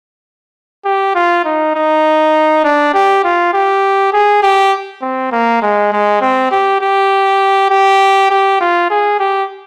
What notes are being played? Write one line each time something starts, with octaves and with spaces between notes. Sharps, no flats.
G4
F4
D#4
D#4
D4
G4
F4
G4
G#4
G4
C4
A#3
G#3
G#3
C4
G4
G4
G4
G4
F4
G#4
G4